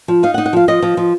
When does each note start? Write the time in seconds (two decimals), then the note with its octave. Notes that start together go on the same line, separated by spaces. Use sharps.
0.08 F3
0.23 D#4 F5
0.34 F#5
0.38 D#4
0.46 F#5
0.53 F3 F5
0.68 F3 D#5
0.82 F3
0.97 F3